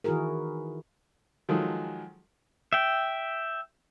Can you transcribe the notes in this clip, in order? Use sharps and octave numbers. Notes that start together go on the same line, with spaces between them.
D#3 E3 E4 F#4 G#4 A#4
D#3 F3 F#3 G#3 G#4 A4
E5 G5